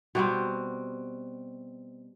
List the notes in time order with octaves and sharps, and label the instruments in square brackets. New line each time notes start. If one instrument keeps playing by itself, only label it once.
[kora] B2 G3 C4 F#4